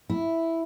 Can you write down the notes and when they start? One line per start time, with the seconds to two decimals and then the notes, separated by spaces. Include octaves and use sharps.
0.10 E4